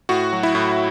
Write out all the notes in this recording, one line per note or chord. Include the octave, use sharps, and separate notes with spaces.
A2 F#4
F#3
E4
A2